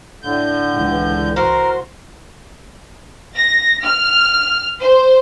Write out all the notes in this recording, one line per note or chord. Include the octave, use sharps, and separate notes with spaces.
A2 D3 G6
C#2 E3
C2 F#4 A#4 C5 C6
A#6
F6
C5